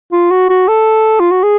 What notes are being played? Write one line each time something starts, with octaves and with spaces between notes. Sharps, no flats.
F4
F#4
F#4
A4
F4
F#4
G#4